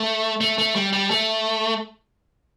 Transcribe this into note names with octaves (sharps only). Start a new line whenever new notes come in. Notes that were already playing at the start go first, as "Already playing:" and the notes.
Already playing: A3
A3
A3
G3
G3
A3